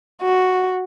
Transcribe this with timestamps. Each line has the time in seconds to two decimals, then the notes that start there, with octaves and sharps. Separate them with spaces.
0.22 F#4